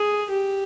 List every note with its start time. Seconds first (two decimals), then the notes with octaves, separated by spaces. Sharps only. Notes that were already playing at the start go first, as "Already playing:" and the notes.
Already playing: G#4
0.30 G4